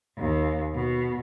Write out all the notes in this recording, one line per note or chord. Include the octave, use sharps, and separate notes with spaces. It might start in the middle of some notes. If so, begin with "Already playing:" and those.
D#2
B2